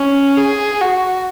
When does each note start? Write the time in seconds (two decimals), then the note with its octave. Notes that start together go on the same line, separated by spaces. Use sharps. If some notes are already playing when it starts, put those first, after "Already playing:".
Already playing: C#4
0.37 G#4
0.80 F#4